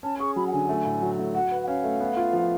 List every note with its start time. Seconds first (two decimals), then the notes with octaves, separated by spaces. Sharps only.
0.03 C#4 A5
0.20 G#4 C#6
0.36 F#3 B5
0.47 F#5
0.52 D3 G#5
0.69 A3
0.85 A2
1.02 F#3
1.19 A2
1.34 F#4 F#5
1.51 B4
1.63 F#5
1.67 C#4 F5
1.84 A3
2.00 B3
2.17 F4
2.33 F3